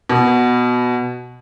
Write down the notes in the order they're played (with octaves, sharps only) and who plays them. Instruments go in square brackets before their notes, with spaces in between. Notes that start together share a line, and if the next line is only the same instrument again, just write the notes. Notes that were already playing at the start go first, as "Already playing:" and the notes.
[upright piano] B2